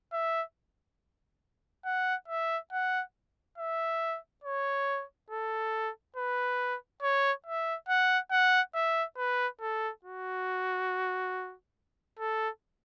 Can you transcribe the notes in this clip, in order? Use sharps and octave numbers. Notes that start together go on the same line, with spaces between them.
E5
F#5
E5
F#5
E5
C#5
A4
B4
C#5
E5
F#5
F#5
E5
B4
A4
F#4
A4